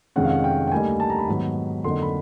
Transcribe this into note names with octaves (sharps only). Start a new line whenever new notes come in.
F2 C3 D#3 G#3 C#4 F#5
F5
F#5
G5
G5
D2 D3 G3 A#3 D#4 G#5
A5
A#5
B5
G#2 D#3 F#3 B3
F2 D3 F#3 A#3 D#4 C6
B5